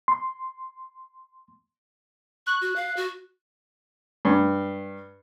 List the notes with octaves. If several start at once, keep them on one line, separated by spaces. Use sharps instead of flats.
C6
C#6 F#6
F#4
F5
F#4
G2